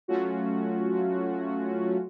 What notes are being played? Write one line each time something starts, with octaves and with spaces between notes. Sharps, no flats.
F#3 A3 C#4 F4 F#4